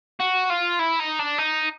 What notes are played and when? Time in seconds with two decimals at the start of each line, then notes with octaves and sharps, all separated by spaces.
0.20 F#4
0.50 F4
0.79 E4
0.99 D#4
1.19 D4
1.38 D#4